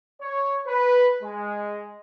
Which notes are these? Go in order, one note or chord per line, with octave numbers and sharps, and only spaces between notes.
C#5
B4
G#3